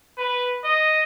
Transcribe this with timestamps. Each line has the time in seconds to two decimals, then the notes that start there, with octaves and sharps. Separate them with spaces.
0.18 B4
0.64 D#5